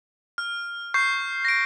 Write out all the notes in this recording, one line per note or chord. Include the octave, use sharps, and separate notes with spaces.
F6
C#6 G6 C7
A#6 D7